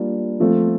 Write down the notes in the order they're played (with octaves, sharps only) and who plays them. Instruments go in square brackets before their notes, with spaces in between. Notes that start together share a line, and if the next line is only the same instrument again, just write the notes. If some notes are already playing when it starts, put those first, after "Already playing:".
Already playing: [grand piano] G3 A#3 D4 F4
F3 A3 C4 F4